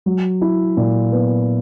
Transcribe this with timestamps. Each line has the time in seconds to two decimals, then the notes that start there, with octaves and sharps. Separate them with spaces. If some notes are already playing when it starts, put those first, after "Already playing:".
0.06 F#3
0.41 E4
0.77 A#2
1.12 B3